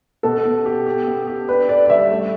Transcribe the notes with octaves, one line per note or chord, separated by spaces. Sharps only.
B2 A4
B2
G4
G4
B3
G4
D4 B4
A4 D5
D5
G3 E5
A3